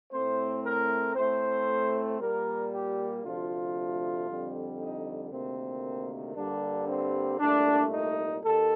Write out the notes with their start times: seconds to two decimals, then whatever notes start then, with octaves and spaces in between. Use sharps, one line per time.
0.12 A2 A3 C4 C5
0.64 A#4
1.15 A2 A3 C4 C5
2.19 A#2 G3 A#3 A#4
2.72 G4
3.23 D2 C3 F3 A3 F4
4.28 F2 D3 G3 C4
4.80 D#4
5.32 D2 C3 D#3 A#3 C4
6.36 G2 D3 G3 A#3 D4
6.88 C4
7.39 C2 A#2 A3 D4
7.92 D#4
8.44 D#2 D#3 A4